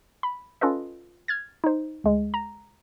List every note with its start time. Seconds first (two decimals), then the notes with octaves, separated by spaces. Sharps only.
0.23 B5
0.61 C#4 F4 A4 B4 D#5
1.28 F6 G#6 A6
1.64 D#4 C5
2.04 D2 G#3
2.34 A#5